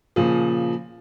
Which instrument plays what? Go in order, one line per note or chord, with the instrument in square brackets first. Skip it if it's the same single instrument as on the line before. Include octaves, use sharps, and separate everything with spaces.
[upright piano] A#2 C#3 F3